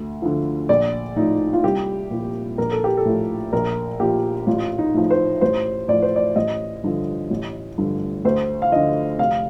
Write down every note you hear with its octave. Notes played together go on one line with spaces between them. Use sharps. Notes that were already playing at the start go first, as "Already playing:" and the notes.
Already playing: D2
D3 F3
A#1 D5
A2 F3 D#4
F4
C2 G4
A#2 F3
A#1 A#4
A4
G4
A4
A2 F3
A#1 A#4
A#2 F3 G4
A1 F4
D#4
A2 F3
C5
A1 C5
A2 F3 D5
C5
D5
A1 D#5
G2 D3 F3
A1
G2 D3 F3
D2 C5
F5
D3 F3 D#5
F1 F5